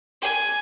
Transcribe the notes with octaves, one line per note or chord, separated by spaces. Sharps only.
G#5